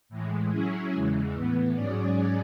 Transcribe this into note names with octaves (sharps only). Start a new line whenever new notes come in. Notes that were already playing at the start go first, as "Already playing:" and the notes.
A2 E3 G#3
F#3 C#4 E4 G#4
E2 C#3 E3 G#3
A2 E3 B3
G#2 F#3 C#4 G#4 D5